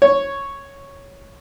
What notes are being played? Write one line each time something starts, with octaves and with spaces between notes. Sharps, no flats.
C#5